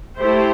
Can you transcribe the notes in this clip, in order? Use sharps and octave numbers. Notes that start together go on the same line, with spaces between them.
A3 E4 G4 C5